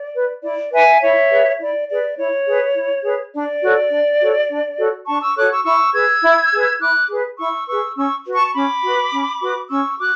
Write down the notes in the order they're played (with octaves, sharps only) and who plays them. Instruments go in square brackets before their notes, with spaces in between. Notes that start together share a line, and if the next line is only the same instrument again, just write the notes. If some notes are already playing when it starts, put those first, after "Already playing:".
Already playing: [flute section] D5
B4
E4 D5
B4 E5 G#5
E4 C#5 E5
G#4 B4
E4 D5
G#4 B4 D5
E4 C#5
G#4 B4
E4
G#4 B4
D4 D5
F#4 A4 C#5
D4
F#4 A4 C#5
D4
F#4 A4 C#5
D4 A5 C#6
C#6 E6
F#4 A4 C#5 D6 F#6
C#6 E6
E4 C#6 E6
G#4 B4 E6 G#6
E4
G#4 B4
E4 D6 F#6
G#4 B4
E4 C#6 E6
G#4 B4 C#6 E6
C#4 C#6 E6
F#4 B4
A5 C#6
C#6
C#4 B5 D6
F#4 B4
C#4
F#4 B4
C#4 C#6 E6
F#4 D6 F#6